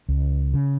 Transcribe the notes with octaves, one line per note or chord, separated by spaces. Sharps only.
C#2
C#3